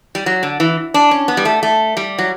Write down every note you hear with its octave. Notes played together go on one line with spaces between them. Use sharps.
G3
F#3
D3
E3
D4
C#4
B3
G3
A3
A3
G3
F#3